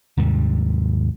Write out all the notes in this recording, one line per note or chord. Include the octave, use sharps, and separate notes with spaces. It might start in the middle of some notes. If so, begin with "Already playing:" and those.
D#2 G#2 C3 G3